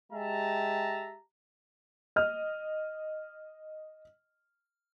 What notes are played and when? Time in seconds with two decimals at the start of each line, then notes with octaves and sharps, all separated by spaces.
0.12 G#3 G4 E5 A5 A#5
2.16 D#5 F6